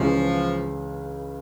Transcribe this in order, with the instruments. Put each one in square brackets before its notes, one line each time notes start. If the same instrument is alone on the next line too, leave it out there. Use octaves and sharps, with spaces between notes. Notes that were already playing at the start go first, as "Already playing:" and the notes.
Already playing: [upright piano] C#2 C#3 E3 G#3 C#4 [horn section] F3